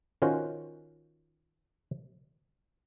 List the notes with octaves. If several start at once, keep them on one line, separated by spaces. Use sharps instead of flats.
D#3 C#4 F4 F#4 C5